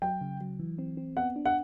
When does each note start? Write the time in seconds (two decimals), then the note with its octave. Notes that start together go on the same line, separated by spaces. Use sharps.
0.02 F#3 G5
0.21 C#3
0.41 F#3
0.60 E3
0.78 C4
0.97 C4
1.17 B3 F#5
1.36 D4
1.45 F#5